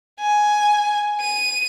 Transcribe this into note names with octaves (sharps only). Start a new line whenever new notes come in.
G#5
D#7